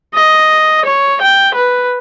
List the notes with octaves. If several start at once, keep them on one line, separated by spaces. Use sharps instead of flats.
D#5
C#5
G5
B4